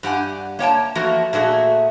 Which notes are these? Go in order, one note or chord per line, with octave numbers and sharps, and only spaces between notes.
G2 G4 F#5 G#5
A#3 C#5 G5 A5
E3 F3 A3 A#3 F#4
A#2 A3 F#4 G#4